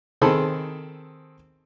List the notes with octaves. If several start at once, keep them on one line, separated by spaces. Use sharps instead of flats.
D#3 C4 G#4 A4 B5 D#6